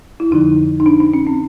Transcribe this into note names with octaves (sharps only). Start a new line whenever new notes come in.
E4
F2 D3 F3 D#4
D#4
D4
D4
C#4
C4